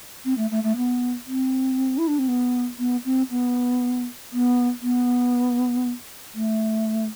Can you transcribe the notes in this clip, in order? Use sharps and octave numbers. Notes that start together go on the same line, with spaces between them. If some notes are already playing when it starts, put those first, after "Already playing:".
C4
A3
A3
A3
B3
C4
E4
D4
C4
B3
B3
C4
B3
B3
B3
A3